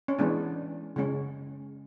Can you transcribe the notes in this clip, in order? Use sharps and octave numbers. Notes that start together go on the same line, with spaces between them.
C#4
E3 G#3 B3 D4
C#3 G#3 C#4